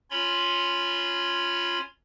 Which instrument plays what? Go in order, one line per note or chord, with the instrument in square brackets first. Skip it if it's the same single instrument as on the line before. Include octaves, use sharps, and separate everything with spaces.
[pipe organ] C#4 F4 C#5 B5 C6